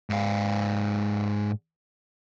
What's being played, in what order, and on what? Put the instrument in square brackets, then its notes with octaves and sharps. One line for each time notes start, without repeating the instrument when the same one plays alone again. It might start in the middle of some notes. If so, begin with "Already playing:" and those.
[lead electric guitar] G#2 F5